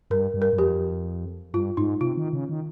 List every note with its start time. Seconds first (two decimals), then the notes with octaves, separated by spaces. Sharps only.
0.10 G2 A#4
0.34 G2
0.42 A#4
0.53 G2
0.58 F2 G4
1.54 G2 F4
1.77 G#2 D#4
2.01 C3 F4
2.17 D#3
2.33 C#3
2.49 D#3